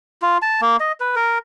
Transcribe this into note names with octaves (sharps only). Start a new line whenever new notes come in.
F4
A5
A#3
D#5
B4
A#4